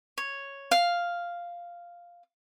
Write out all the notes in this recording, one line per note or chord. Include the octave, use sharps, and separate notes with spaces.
C#5
F5